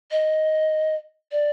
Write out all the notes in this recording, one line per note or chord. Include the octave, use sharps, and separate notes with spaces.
D#5
D5